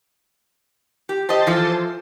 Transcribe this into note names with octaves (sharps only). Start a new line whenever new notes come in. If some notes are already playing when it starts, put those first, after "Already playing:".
G4
G4 C5 D#5 A5
E3 F3 A4